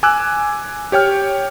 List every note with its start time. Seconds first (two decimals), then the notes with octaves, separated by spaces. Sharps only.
0.03 G#5 D6 E6 F#6
0.92 G4 C#5 G5 F6